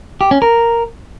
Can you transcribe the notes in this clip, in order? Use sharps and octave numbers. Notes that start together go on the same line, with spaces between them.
G4
C#4
A#4